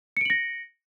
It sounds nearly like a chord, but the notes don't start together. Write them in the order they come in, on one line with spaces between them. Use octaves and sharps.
C#7 D7 F#7 A#6